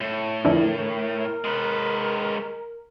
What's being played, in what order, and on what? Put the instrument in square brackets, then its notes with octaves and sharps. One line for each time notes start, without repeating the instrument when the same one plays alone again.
[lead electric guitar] A2
[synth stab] F2 D3 E3 [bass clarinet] A#4
[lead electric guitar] G#3 B4